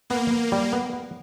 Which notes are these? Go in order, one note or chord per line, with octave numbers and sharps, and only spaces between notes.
A#3 B3
B3
G3
B3
B3